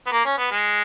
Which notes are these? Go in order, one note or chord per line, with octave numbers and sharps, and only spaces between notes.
B3
A#3
C#4
B3
G#3